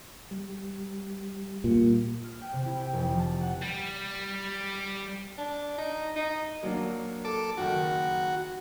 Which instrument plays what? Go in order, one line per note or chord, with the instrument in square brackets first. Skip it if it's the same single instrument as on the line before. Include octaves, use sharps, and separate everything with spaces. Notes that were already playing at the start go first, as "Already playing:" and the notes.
[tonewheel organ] G3
[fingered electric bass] A#2
[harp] F6
G5
C3
E4
G5
F1
F3
A5
F#5
[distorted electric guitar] G3
[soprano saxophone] D4
D#4
D#4
[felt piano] F#3 A#3 D4
[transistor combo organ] A4 D6
[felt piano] F#1 D#3 [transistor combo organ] F#4